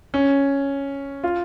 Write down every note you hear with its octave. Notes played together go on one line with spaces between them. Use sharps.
C#4
F4